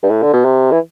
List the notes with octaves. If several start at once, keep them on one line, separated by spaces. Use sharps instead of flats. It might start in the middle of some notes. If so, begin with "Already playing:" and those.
G2
A2
D3
B2
C3
E3